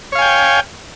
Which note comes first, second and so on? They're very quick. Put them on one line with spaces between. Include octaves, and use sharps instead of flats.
C#5 F5 G#5 G5